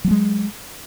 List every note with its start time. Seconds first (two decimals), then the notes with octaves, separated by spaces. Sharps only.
0.04 F#3
0.08 A3
0.11 G#3